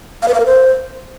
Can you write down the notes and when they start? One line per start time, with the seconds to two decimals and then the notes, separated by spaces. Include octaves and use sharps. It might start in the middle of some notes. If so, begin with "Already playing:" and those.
0.22 F5
0.28 B4
0.34 F5
0.40 A#4
0.46 C5